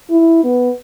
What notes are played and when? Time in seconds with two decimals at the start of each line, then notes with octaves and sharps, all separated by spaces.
0.10 E4
0.44 B3